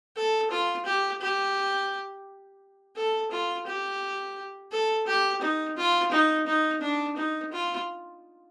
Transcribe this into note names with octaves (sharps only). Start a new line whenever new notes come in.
A4
F4
G4
G4
A4
F4
G4
A4
G4
D#4
F4
D#4
D#4
D4
D#4
F4